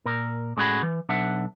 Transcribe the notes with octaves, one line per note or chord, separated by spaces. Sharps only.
A#2 A#4
A2 G#3 C#4 F#4 G#4 B5
E3
B1 D4 E5 F#5